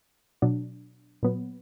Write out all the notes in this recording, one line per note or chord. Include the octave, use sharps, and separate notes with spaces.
B2 F#3 D4
A#2 F#3 B3